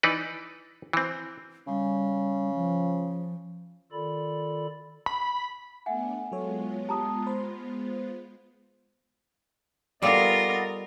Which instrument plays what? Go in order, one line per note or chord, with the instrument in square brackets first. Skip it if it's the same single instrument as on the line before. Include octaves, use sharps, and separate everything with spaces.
[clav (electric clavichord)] E3 D#4 B4 D5
E3 C4
[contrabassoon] C#3 [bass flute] G3
[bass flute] F3
[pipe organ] D#3 F4 A4 D5 B5
[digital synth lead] B5
[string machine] A3 B3 D4 [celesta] E5 F#5 G#5
[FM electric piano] F#3 A4 C#5 [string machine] G#3 B3 F4
[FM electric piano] G4 [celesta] A5 A#5 D#6
[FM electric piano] C5 [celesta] B5
[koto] G3 A4 F5 [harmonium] B3 D5 D#5 [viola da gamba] F4 A#4